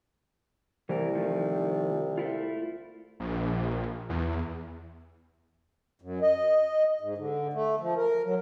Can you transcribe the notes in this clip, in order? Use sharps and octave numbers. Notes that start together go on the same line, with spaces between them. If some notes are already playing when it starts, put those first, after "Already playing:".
C2 E3 A3 A#4
D#3 F3 A3
A3 E4 F4
A#1
E2
F#2
D#5
G#2
D3
A3
F3
A#4
F#3